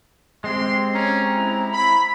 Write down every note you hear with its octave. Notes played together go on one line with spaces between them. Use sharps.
G#3 C4 G4 C6
C#4 A#5
E4
B5